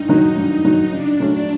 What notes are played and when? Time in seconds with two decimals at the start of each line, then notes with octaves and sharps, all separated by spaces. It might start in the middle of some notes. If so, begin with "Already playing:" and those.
Already playing: G2 D#4
0.08 D#3 F#3
0.36 G2
0.65 D#3 F#3
0.92 C#3 D4
1.20 F#3 A3 C#4